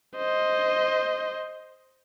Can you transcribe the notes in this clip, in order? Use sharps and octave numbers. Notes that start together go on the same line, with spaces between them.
C5 D#5